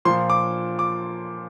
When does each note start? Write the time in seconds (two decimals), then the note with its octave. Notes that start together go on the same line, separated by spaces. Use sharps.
0.05 A#2 F3 C6
0.30 D6
0.79 D6